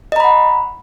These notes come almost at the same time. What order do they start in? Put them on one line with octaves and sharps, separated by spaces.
D#5 A#5 B5 F#5